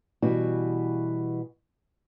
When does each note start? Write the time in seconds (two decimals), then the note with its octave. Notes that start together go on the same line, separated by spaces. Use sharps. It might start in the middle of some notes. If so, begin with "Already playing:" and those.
0.22 B2 E3 G3 E4 F#4